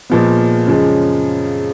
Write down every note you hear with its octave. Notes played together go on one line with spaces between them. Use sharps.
A#2 F3 G#3 B3
F#2 C#3 F3 G#3